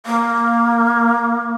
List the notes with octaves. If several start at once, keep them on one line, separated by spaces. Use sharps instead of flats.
A#3